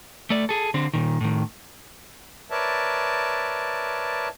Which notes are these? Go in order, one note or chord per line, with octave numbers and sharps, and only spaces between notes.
A3 D5
G#4 A4
D3 C4
A#2 D#3
A2 D#3
A#4 B4 C#5 D5 E5 A5